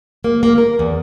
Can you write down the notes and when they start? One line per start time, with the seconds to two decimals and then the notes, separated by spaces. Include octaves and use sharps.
0.24 A#3
0.43 A#3
0.58 A#4
0.79 E2